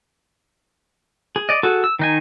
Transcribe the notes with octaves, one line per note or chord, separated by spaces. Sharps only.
G#4
D5 D#5
F#4 G#4 A4
E6
D#3 D#4 G#5